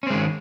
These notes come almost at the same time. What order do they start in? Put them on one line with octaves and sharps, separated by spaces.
C#4 C4 G#3 D#3